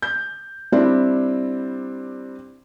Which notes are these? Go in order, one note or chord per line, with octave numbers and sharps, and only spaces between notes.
G6
G3 C4 D4 E4